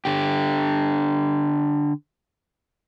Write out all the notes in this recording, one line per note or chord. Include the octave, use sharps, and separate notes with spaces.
D3 G4